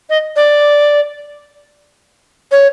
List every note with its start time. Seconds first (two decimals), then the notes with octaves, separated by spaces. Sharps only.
0.10 D#5
0.36 D5
2.52 C#5